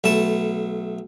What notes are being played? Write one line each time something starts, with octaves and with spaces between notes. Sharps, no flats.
B1 A3 A5